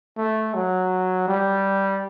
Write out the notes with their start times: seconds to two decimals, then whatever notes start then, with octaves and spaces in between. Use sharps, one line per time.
0.18 A3
0.54 F#3
1.28 G3